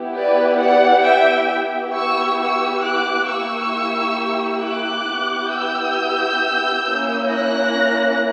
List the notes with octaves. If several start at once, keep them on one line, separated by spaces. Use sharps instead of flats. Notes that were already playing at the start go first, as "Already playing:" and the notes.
Already playing: B3 E4 G4
B4 D5
D5 F#5
E5 G5
B3 E4 G4
C#6 E6
C#6 E6
D6 F#6
A#3 E4 G4 C#6 E6
D6 F#6
B3 E4 G4
E6 G6
A#3 C#4 E4
F#6 A#6